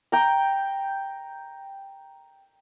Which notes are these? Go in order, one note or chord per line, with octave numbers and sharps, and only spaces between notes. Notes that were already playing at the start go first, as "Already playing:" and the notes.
G5 A#5